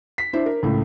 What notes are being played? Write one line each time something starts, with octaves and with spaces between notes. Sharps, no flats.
B6
D4 E4 C5
A#4
C#2 A2